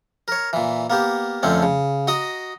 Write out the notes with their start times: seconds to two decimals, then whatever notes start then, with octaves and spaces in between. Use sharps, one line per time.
0.28 A#4 C#5
0.53 A#2 E3
0.90 A#3 B3 G4
1.43 F2 D3 A3 C4 C#4
1.63 C#3
2.07 F#4 D#5 A#5 D#6